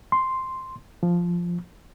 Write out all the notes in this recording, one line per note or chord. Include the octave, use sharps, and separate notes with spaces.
C6
F3